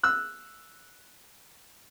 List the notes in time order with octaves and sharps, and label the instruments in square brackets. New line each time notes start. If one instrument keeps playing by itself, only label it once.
[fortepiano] E6 F#6